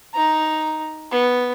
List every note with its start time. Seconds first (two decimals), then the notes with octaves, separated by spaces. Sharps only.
0.14 D#4 A#5
1.12 B3